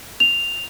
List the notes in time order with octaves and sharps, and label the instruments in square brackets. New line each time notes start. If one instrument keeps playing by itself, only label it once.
[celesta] F7